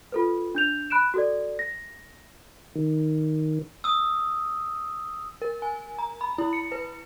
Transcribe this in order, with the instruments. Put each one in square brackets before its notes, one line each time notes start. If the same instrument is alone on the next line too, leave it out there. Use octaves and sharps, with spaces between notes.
[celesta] F4 A4 B4
D4 G6 F7
B5 F#6 D7 E7
F#4 A4 D5
A#6
[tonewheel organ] D#3
[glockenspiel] D#6 E6
[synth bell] A#4
G#5
A#5
B5
E4
C#7
B4